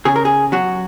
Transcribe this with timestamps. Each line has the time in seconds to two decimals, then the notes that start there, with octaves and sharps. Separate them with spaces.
0.05 C#3 G#4
0.16 A#4
0.25 G#4
0.52 F#3 F#4